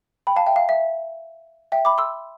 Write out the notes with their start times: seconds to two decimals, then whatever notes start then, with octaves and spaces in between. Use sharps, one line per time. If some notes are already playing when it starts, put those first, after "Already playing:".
0.27 G5 B5
0.36 F5 A5
0.46 E5 G5
0.56 F5
0.69 E5
1.72 E5 G5
1.85 B5 D6
1.98 C6 E6